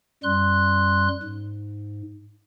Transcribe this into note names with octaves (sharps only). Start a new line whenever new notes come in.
F#2 G3 C6 F#6
G#2